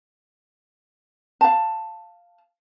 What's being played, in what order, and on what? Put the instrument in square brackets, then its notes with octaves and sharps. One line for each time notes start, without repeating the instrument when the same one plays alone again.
[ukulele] F5 A5